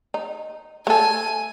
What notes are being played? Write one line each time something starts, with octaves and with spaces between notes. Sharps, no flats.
D#4
A3 A4 G#5